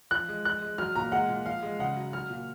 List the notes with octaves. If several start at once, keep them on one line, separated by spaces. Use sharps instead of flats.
F3 F#6
G#3
F3 F#6
G#3
F#3 F6
A#2 A#5
G#3 F#5
A#2
F3 F5
G#3
C#3 F#5
F#3
F#3 F6
A#2